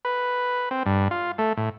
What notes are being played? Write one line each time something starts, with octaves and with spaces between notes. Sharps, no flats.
B4
C4
G2
F4
A3
A2